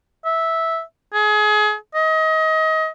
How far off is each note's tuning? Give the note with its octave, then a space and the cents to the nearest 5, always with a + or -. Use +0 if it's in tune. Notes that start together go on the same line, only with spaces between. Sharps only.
E5 -10
G#4 +30
D#5 +30